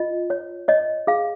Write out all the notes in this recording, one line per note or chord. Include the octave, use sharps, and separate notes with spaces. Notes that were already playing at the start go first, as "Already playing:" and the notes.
Already playing: F4 D#5
C#5
C#5 D#5
G#4 F5